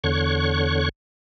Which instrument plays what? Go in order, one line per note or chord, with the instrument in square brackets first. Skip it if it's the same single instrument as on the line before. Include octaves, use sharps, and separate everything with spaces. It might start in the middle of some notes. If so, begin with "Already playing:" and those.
[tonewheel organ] E2 D3 C#5 C#6 F#6